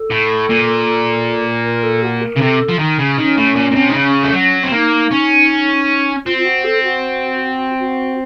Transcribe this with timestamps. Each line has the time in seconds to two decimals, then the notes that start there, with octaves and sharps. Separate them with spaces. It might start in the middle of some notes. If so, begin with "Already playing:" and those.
Already playing: A4
0.10 A2
0.49 A#2
1.65 A#4
1.83 A4
2.03 F#4
2.21 A#4
2.36 C#3
2.41 C3 A4
2.69 F3
2.79 D#3
2.99 C#3
3.18 D#3 C#4
3.37 A2
3.56 A#2
3.71 A#2
3.76 C3
3.90 D#3
3.94 C#3
4.23 A3
4.33 F#3
4.63 C4
4.72 A#3 D#4
5.11 C#4
6.25 C4 F4
6.37 F4
6.45 F#4
6.64 A4
6.83 F#4
7.79 F#4